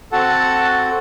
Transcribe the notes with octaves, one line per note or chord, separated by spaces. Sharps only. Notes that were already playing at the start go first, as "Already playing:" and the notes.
C4 F#4 A4 F#5 A5